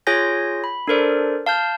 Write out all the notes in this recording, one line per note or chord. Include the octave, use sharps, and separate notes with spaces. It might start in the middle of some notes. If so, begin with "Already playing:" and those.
F4 G#4 C#5 G#5 G6 A#6
B5
D4 A4 A#4 C5 D5
F5 A5 F6 G6